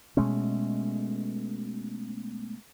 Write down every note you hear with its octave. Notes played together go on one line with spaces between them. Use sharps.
B2 G#3 A3 C#4